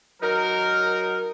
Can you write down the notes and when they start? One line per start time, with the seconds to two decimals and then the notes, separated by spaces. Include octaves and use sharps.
0.22 F#3 D#4 A#4